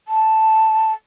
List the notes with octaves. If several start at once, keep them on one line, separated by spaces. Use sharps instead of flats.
A5